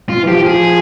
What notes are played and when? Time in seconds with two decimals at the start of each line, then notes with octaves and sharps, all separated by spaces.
0.09 F4
0.23 E3
0.28 F3 G4
0.46 G#4